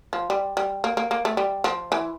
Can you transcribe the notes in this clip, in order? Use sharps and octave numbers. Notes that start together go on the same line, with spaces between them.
F3
G3
G3
A#3
A#3
A#3
A3
G3
F3
E3